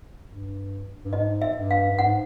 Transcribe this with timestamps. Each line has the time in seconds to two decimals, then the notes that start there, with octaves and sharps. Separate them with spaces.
0.28 G2
1.05 G2
1.13 G#2 D#5
1.42 E5
1.56 G2
1.71 F5
1.90 G2
1.99 G#2 F#5